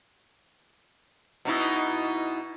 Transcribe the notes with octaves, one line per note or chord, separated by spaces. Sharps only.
B2 D#4 E4